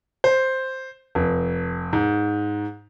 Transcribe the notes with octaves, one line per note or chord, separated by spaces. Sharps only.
C5
F1
G#2